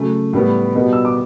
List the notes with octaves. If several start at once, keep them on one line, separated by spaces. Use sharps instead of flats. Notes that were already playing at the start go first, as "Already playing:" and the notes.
Already playing: C#3 F#3 A3
A2 G3 B3
B2 G3 B3
E6
D6